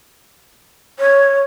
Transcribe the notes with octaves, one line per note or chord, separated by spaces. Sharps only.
C#5